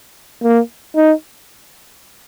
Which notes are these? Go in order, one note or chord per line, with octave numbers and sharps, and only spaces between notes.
A#3
D#4